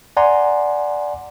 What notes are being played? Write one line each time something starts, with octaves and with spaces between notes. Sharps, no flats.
D5 F#5 G#5 A#5 C6